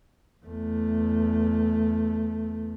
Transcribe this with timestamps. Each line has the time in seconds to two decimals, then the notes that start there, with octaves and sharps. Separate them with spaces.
0.46 E2 A3